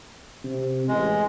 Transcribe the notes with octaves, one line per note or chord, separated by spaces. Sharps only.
C3
A1 G#3